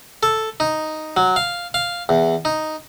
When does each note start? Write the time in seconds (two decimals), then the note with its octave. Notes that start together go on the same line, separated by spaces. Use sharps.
0.23 A4
0.60 D#4
1.17 F#3
1.36 F5
1.74 F5
2.09 E2
2.45 D#4